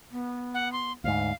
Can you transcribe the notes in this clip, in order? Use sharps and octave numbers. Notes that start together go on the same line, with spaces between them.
B3
F#5
C6
D2 G#2 F5